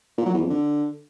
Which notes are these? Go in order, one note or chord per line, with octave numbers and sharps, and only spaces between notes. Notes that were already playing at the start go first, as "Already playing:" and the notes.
A#2
F#3
E2
F2
D3